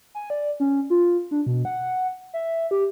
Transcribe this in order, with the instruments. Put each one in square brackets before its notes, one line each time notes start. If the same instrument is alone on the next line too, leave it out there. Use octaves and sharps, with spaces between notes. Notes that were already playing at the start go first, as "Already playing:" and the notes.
[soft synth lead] G#5
D5
C#4
F4
D4
B2
F#5
E5
G4